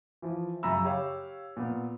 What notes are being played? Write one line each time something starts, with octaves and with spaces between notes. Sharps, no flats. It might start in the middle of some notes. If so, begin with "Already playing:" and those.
E3 F3
F#2 C#3 E5 A#5 B5 E6
G4 C#5 F5
A#2 B3